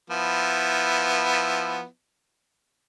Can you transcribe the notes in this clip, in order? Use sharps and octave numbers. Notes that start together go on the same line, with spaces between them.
F3 B3 E4